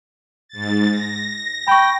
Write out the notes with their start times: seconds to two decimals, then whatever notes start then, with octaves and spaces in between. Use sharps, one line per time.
0.48 G#2 A6
0.90 A#6
1.68 G5 B5 C#6